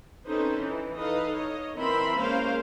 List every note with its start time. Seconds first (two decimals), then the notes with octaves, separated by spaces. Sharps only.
0.25 C4 C#4 D#4 A4 B4 C5
0.58 E3
0.96 D#4 A4 B4 D#5 F5
1.34 C#5 D#5
1.76 E3 C4 A#4 E5 B5 C6
2.16 G#3 A#3 C#4 A#4 C5 F5